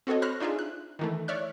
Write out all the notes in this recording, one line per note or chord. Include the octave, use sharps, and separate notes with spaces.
C4 F#4 A4 C#5 D#5
C5 B5 C#6 F6 F#6 A#6
D4 D#4 F4 G#4 E5
F#6
D#3 E3 A3
C#5 D5 E5 F6 F#6